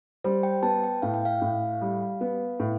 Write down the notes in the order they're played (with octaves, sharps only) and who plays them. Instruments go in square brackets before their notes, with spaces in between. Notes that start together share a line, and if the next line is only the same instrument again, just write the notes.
[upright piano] G3 [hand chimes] C5
[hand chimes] G5
[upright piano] B3 [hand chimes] A5
[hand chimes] G5
[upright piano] A2 [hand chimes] F5
[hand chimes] G5
F5
[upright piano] A2
G3
B3
A2